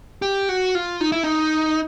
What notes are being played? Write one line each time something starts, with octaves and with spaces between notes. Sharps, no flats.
G4
F#4
F4
D#4
E4
D#4